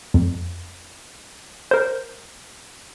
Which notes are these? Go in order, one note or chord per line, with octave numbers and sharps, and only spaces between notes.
F2
A#4 C5